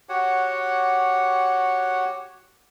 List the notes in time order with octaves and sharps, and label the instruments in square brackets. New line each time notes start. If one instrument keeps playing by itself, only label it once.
[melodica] F#4 G4 C#5 F#5